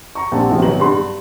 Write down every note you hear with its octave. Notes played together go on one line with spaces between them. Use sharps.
A#5 C#6
A#1 G3 C4 F#5 A5
A2 C3 F3 C4 F#4
G#1 B2 F#3 B3 A#5 F#7
G2 B5 C6
G2